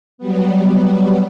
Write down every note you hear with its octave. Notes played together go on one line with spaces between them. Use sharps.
F#3 G3 B3